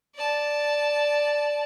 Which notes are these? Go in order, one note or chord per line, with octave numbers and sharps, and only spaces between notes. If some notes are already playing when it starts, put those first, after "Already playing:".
D5 A5